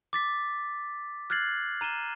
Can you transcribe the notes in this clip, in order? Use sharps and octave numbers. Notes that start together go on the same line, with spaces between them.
D6 A6 B6
F6 F#6 G#6 A6 C7 F#7
A#5 D#7 E7 G7